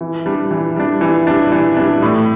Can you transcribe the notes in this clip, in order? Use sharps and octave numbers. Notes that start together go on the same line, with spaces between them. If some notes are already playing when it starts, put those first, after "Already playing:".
E3
G3 D4
E3
G3 D4
E3
G3 D4
E3
G3 D4
A2